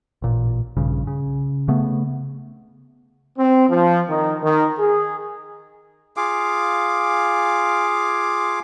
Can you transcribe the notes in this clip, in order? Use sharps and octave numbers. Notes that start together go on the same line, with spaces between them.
A1 A#2
A#1 G2 C#3
C#3
C#3 A3 B3
C4
F3
D#3
D#3
G#4
F4 G#4 F5 D6